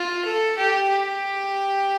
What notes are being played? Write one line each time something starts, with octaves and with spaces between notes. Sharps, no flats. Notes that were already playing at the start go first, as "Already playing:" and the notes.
Already playing: F4
A4
G4
G4